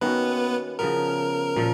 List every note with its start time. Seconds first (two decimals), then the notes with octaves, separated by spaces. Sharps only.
0.01 D#3 A#3 B3 C#4 F#4 B4
0.79 C#3 F3 B3 A#4
1.56 A#2 F3